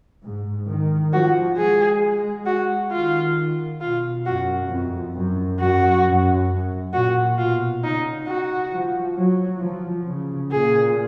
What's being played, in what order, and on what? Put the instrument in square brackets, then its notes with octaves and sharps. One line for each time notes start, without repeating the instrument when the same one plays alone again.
[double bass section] G#2
D#3
[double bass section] F3 [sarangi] F#4
[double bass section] G#3 [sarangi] G#4
[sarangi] F#4
[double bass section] D#3 [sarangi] F4
[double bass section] B2 [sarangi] F4
[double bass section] F#2 [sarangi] F#4
[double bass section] F2
F#2
[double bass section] F#2 [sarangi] F#4
[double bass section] F#2
F#2
[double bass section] A#2 [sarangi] F#4
[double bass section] B2 [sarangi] F4
[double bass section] C#3 [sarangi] D#4
[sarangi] F#4
[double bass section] F3
F#3
F3
C#3
[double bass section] A#2 [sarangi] G#4